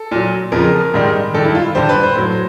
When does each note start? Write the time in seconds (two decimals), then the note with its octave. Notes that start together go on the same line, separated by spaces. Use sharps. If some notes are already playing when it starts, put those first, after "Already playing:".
Already playing: A4
0.11 A#2 F#3
0.52 F2 C#3 F3 A#4
0.94 G#2 D#3 G3
1.34 G2 D#3 G3 A4
1.45 E4
1.55 F4
1.75 G2 D3 G3 C5
1.89 B4
2.03 C5
2.15 A2 F#3